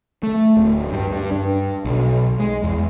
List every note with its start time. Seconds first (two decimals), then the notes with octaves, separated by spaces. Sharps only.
0.23 A3
0.57 D1
0.90 G2
1.12 G2
1.32 G2
1.85 B1
2.39 G#3
2.63 E2